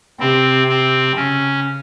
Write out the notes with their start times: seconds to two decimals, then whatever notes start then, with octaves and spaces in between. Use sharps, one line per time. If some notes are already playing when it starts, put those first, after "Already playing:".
0.20 C3 C4
0.68 C4
1.16 C#3 C#4